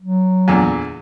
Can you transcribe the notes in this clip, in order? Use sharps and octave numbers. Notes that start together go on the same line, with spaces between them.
F#3
E2 A#2 D3